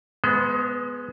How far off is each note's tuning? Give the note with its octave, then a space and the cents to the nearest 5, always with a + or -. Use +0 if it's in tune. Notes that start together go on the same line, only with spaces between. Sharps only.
G#3 +15 B3 +0 C5 -40